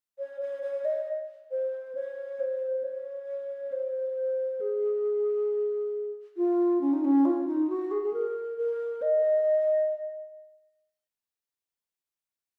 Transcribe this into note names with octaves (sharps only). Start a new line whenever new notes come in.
C#5
C#5
C#5
D#5
C5
C#5
C5
C#5
C5
G#4
F4
C#4
D#4
C#4
F4
D#4
F#4
G#4
G#4
A#4
A#4
D#5